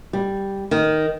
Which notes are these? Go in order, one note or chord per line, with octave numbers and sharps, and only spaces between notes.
G3
D#3